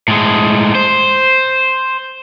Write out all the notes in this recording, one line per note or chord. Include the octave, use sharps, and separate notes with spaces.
A2 G#3
C5